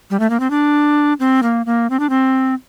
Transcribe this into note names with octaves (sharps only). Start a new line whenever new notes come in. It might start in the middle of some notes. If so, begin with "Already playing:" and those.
G3
A3
A#3
C4
D4
C4
A#3
A#3
C4
D4
C4